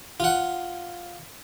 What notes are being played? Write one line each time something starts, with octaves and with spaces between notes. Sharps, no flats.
F4 F#5